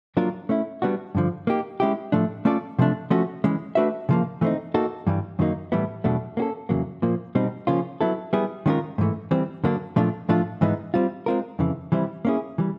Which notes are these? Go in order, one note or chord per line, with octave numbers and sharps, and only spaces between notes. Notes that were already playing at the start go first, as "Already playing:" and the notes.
F#3 A#3 D4 F4 A#4
A3 C#4 E4
G3 B3 D4 F#4
G2 D3 F3
A#3 D#4 G4
G#3 C#4 E4 G4
A2 F3 A3 D4
A3 C#4 F4 A4 D5
C3 F3 A3 D4
F3 A3 C#4 F#4
E3 G#3 C#4
A3 D4 F#4 B4 E5
C#3 F3 A#3
E3 A3 C4 D#4
A#3 D#4 F#4 A4
G2 E3 G3
F#2 D#3 F#3 A#3 D#4
A2 E3 G3 B3 E4
E2 B2 F#3 A3 D4
A#3 C#4 F#4 A4
E2 C#3 F#3 A#3
A#2 F3 A#3
B2 G3 C4 D#4
C#3 F3 A#3 C#4 F4
F#3 B3 E4 A4
G3 B3 E4 G#4
D#3 G#3 C#4 F4 A#4
G#2 E3 A3
E3 G3 C4
D3 F#3 A#3 D4
A#2 F3 A3 D4 F4
A2 F3 A3 D4 F4
G#2 E3 G#3 B3 D#4
G3 C4 F4
G#3 C4 F4 A#4
F2 C#3 E3
E3 G3 C4 E4
A#3 C#4 E4 G#4
E3 G3